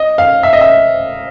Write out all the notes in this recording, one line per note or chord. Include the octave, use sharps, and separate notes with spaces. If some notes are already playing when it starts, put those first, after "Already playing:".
Already playing: D#5
F5
E5
D#5
E5